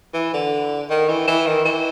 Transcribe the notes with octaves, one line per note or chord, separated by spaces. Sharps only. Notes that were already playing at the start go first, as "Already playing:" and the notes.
E3
D3
D#3
E3
E3
D#3
E3